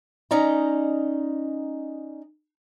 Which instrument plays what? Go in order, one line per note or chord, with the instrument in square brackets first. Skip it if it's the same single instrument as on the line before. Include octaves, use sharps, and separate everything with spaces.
[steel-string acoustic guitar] C#4 D#4 D5 D#5 A#5